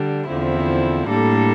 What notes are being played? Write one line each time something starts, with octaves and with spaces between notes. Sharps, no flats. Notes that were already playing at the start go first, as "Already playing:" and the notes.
Already playing: D3 G3 D4
E2 D3 F3 C4 E4
A2 G3 A#3 D4 A4